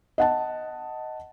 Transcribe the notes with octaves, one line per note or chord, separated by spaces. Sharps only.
D#5 F#5 A5